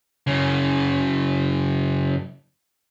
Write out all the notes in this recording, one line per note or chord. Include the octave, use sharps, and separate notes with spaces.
F#2 C#3